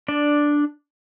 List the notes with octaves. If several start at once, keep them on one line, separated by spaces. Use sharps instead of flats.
D4 D5